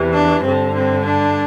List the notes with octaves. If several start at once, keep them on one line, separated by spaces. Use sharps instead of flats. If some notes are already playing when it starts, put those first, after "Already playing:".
Already playing: E2 C3 E3
D4
G2 D3 C4
C4
D4